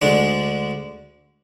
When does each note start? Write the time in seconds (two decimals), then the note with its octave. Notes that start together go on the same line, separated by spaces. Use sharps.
0.02 D2 D3 G#3 D4